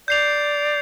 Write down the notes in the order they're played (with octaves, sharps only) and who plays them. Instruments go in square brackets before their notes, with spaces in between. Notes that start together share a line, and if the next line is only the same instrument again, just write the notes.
[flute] D5 [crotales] G6 C7 F7